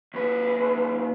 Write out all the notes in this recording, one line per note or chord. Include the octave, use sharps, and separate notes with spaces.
D#2 B4